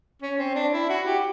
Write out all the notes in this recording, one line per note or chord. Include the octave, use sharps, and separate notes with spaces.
C#4
C4
D4
E4
F#4
G4